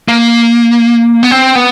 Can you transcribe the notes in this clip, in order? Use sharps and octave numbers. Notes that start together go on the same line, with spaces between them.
A#3
B3
C4
B3